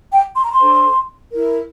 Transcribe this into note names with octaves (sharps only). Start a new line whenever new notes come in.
G5
C6
A#5
C6
D4 A4 C5
E4 A#4